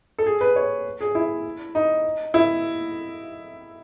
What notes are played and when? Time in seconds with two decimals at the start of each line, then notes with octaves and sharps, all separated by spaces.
0.19 A4
0.26 G#4
0.41 B4
0.56 C#5
1.01 G#4
1.15 E4
1.75 D#4
2.34 E4